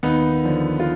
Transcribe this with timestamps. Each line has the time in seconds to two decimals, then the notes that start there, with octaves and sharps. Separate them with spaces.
0.03 D#2 B3 D#4
0.45 D3 F3
0.80 F4